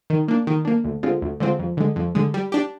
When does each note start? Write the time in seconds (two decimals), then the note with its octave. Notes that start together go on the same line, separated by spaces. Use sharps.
0.10 D#3
0.28 A#3 D4
0.47 D#3
0.65 A#3 D4
0.84 D2
1.03 D3 G#3 C4 F4
1.22 D2
1.40 D3 G#3 C4 F4
1.59 F2
1.77 D3 G#3
1.96 F2
2.15 D3 G#3
2.34 G3
2.52 D4 G4